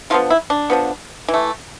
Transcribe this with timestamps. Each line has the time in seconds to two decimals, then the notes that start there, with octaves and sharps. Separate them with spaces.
0.10 D3 F3 B3 F4
0.30 E4
0.50 D4
0.70 D3 F3 B3
1.28 E3
1.34 A3